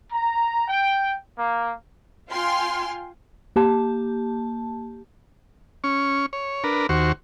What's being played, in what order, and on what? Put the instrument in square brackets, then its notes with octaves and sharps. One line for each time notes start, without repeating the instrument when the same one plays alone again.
[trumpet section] A#5
G5
A#3
[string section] F4 F5 G5 G#5 C6 F6
[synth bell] A#3 G4 A5
[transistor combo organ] C#4 C#6
C#5
D4 A#4 B4
D#2 F#4 C5 C#6